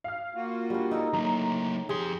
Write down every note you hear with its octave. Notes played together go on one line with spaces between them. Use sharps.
F5 F6
A#3 F4 F#4
G3 D4
D#4 A4 A#4
A2 F#3 A#3 A#5
F2 G4 G#4 C6